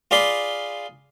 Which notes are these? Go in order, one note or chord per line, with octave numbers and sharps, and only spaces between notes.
F4 G#4 D5 B5 C6